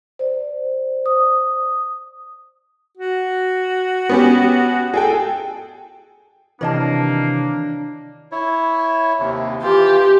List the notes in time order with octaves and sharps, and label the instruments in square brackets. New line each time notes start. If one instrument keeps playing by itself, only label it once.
[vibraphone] C5 D5
D#6
[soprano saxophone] F#4
[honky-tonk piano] B3 C#4 G4
G#4 A4 G5
[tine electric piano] C3 D#3 E3 [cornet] A#3 [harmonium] D4 [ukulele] C#5 D#5 A5
[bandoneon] E4 C#5
D#2 C3
[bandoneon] E3 F4 [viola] G4